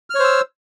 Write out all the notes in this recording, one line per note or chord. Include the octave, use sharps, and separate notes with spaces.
C5 C#5 E6 F6